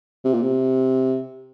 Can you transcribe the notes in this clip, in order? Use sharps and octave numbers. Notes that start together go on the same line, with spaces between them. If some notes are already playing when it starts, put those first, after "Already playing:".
C3
A#2
C3